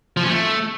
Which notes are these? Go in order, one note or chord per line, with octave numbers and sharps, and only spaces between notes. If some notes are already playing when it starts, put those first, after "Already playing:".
F3
C#4
A3